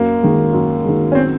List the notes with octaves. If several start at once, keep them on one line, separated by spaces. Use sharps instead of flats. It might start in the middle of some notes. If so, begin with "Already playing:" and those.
Already playing: F#2 A#3
D#3 G#3
F#2
D#3 G#3
C#4
C4